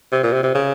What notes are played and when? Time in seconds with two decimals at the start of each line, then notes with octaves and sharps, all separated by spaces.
0.12 C3
0.23 A#2
0.33 C3
0.43 C3
0.55 C#3